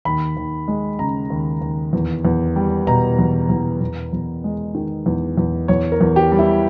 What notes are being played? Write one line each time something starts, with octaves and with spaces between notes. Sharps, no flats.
D#2 B5
D#2
G#3
C#3 A#5
D#2
D#2
E2
E2
G3
B2 A#5
E2
E2
E2
E2
G#3
D#3
E2
E2
E2 C#5
A#4
E2
G4
G3
E4